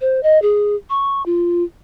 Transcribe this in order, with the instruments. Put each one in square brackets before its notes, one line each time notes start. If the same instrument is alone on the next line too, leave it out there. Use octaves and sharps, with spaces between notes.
[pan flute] C5
D#5
G#4
C#6
F4